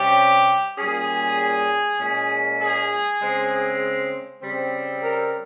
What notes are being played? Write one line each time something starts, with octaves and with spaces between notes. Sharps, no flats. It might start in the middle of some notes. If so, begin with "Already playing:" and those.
Already playing: C3 G3 C#4 G4
A#2 G3 C#4 G#4
A#2 G#3 C#4
G#4
C#3 G#3 C4
C#3 G3 C4
A#4